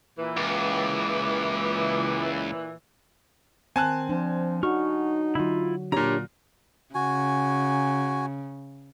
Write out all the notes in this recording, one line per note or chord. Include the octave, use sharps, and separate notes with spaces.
A#2 E3
C#2 D6
D#3 C4 G#5 A5 F#6
F3 D4
D#4 F#4 C#6 F6
D3 F#3 E4 F4
A#2 D4 G4 C#5 A#5
C#3 F#4 G#5